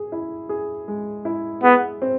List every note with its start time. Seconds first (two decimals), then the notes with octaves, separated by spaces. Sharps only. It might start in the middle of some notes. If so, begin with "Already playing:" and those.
Already playing: G#4
0.12 E4
0.49 G#4
0.88 G#3
1.25 E4
1.63 B3 G#4
2.02 C4